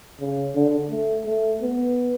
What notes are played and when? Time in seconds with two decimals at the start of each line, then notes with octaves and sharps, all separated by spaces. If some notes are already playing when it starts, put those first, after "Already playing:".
0.20 C#3
0.56 D3
0.90 A3
1.26 A3
1.62 B3